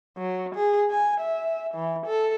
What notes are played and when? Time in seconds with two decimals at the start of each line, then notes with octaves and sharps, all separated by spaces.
0.18 F#3
0.55 G#4
0.91 G#5
1.20 E5
1.74 E3
2.06 A4